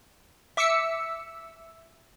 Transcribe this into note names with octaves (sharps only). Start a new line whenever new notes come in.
E5 D6 E6 B6 C#7